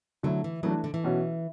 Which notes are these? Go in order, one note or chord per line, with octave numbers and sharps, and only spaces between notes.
D3 F#3 A3 E4
E3
E3 F#3 A3 D4
D3
E3
B2 F#3 C#4 F#4